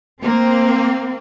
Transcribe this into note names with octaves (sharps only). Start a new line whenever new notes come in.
A#3 C4